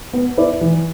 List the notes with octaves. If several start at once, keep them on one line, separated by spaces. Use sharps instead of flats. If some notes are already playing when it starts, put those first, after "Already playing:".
B3
E4 B4 D5
E3